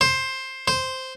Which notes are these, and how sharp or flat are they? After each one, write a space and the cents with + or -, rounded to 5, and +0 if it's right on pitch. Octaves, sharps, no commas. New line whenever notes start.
C5 +10
C5 -5